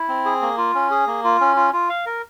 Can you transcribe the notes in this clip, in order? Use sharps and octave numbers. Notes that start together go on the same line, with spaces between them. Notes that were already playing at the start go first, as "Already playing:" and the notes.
Already playing: E4
C4
G#4
A#3
F4
C#4
G#4
A#3
F4
C#4
F4
F4
F5
A#4